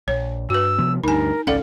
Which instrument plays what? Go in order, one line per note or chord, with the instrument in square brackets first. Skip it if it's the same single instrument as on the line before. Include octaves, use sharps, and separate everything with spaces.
[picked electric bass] A#1 [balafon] C#5
[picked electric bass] G2 [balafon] F#4 B4 [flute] E6
[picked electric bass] C3 F3 B3
[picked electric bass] D2 G2 [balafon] D#4 G#5 [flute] A#4
[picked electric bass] G#1 C#2 C#4 [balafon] A4 F5 F#5 [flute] D5